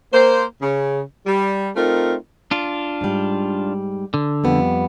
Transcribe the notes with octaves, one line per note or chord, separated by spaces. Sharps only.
A#3 C5
C#3
G3
A3 C4 D#4 F4 A#4
D4 F4
G#2 G3
D3
F2 G3 B3